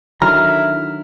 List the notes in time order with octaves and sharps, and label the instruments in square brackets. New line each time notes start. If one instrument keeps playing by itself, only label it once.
[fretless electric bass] D3 D#3 F#3 [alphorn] E4 [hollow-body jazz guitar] A#5 [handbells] F6